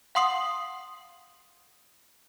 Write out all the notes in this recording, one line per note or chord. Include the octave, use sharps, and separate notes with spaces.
F5 F#5 C6 D#6 C7 F#7